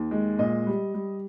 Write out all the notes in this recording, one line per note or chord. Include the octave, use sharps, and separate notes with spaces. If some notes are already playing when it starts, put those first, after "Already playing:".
Already playing: D#2
G#3
A#2 D#5
G3
G3